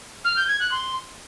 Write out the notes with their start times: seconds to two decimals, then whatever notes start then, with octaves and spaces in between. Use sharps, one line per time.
0.24 F6
0.36 G6
0.48 G#6
0.60 F#6
0.71 C6